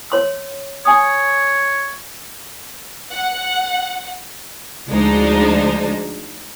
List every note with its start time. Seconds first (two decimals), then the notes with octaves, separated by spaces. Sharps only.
0.10 C#5 C6 E6
0.85 C#5 G#5 D#6
3.11 F#5
4.87 D2 F3 G#3 D4 D#4 C5